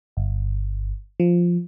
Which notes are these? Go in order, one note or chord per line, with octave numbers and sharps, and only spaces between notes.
G1
F3